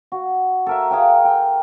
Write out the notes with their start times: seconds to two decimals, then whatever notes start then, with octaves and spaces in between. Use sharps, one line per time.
0.12 F#4
0.66 A4 A#4 E5
0.91 G#4 F5 G5
1.25 G5